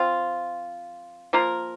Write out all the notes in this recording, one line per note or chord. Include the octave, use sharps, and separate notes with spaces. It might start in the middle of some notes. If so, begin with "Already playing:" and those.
Already playing: F3 C4 F4
F3 A#3 F4 A#4